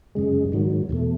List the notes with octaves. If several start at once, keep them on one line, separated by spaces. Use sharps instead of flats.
F#2 C#3 G#3
G#2 D#3 F#3
E2 B2 A3